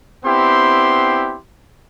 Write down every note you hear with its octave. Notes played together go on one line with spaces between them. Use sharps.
B3 C4 D4 E4 G4 C6